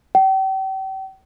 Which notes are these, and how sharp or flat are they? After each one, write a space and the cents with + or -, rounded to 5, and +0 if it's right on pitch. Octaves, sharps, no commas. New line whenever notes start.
G5 -40